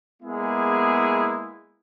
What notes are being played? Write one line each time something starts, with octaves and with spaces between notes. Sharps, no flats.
G#3 A#3 B3 E4 G#4